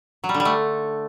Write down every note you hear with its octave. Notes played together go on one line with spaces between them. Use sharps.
F#3
G3
D3
G3
A3